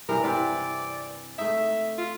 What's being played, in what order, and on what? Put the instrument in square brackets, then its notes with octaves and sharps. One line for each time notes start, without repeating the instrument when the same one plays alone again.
[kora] G2 C3 E3 [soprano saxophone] A#4
[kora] C3 E3 C4 [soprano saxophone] D5
[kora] A3 D#4 [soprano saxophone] E5
[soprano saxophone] F4